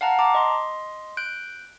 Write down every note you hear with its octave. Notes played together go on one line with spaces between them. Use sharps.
F5 F#5 A5 A#5 F#6
A5 A#5 D6
D#5 C6
F#6 G6 D7